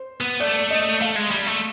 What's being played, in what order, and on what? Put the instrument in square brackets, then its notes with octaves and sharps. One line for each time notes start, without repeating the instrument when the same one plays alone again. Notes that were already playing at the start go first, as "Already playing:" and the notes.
Already playing: [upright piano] C5
[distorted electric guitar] B3
[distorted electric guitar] A3 [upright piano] D5
[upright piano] D#5
[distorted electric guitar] A3 [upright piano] F5
[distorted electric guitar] G#3
G3
A3